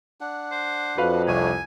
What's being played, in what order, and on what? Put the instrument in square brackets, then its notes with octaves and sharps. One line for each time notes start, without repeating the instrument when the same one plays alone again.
[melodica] D4 F#5
[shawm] C5
[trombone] F2 [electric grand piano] F#4 B4 F5
[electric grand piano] C2 D#7 [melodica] A3 D4 C#5 [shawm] G#5